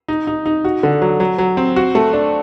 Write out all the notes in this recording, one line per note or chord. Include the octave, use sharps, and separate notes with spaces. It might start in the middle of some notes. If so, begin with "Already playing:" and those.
D#4
D#4
D#4
F#4
D3
F#3
F#3
F#3
C4
F#4
A3
D4